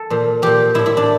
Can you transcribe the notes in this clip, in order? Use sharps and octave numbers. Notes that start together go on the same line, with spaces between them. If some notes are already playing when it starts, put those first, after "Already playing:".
Already playing: A4
A#2 F3
A#2 F3 G4
A2 F3 E4
E4
D4